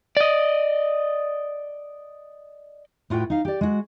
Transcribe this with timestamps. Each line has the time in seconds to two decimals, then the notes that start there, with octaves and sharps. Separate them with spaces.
0.17 D5 D#5
3.10 A2 F4 F#4 B4 G5
3.30 D#4 F5
3.45 G4 D5
3.61 G#3 F#4